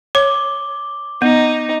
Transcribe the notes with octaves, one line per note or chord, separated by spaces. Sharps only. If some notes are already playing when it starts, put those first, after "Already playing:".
C#5 D6 G7
B3 D#4